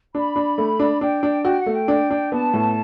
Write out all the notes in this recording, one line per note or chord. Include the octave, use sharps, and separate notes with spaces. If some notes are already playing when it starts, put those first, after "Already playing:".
D4 B5
D4
A3
D4
D4 G5
D4
F#4 G5
F#5
A3
G5
D4
D4
B3 A5
A2